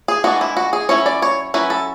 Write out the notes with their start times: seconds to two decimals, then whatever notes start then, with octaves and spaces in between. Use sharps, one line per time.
0.08 G#4
0.24 E3 G#3 D4 F#4
0.41 E4
0.57 F#4
0.73 G#4
0.89 F#3 C#4 E4 C#5
1.06 D5
1.22 C#5
1.54 F#3 C#4 E4 B4
1.70 A4